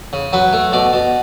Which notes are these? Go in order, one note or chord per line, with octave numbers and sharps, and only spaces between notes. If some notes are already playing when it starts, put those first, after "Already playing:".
C#3
F#3 B4
A3
B2 D5
B2